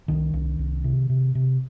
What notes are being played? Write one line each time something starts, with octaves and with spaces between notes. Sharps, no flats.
C2 D#3
C2
C2
C3
C3
C3